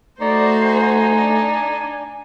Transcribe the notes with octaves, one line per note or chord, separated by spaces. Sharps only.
A3 D#4 F#4 C5 D5
G#5
D4